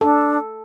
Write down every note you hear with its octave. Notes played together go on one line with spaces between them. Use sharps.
D4 A4